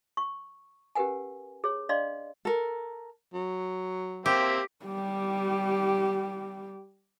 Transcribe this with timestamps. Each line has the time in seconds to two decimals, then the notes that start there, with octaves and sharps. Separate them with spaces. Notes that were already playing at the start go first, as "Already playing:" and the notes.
0.17 C#6
0.95 C#4 G4 A#4 B4 F#5 G#5
1.64 G#4 C#5
1.89 D4 D5 D#5 F5 C6
2.45 A4 A#4
3.34 F#3
4.26 A#3 C4 G4 E5
4.85 G3 G4